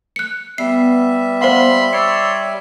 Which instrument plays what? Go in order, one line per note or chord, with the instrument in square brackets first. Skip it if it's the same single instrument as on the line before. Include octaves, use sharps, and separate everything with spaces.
[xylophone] F#6 C#7
[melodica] G3 E5 [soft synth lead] B3 [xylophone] C7
[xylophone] C5 F5 F#5 [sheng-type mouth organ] B5 C6
[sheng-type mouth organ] C#5 D5 C6 [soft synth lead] E6 [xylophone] C#7